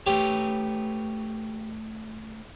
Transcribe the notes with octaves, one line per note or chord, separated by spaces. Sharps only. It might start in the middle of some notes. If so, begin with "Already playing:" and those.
A3 G4 B4 C#5